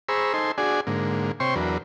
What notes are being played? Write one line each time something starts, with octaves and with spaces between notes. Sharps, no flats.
G#4 C5 A#5 B5 C#6 E6
D#4 A4 C5 G#5 C6
D4 F#4 G#4 D5 G#5
G#2 D3 A#3
C3 C5 C#5 G5 C6 C#6
E2 F#3 D4 A#4 B4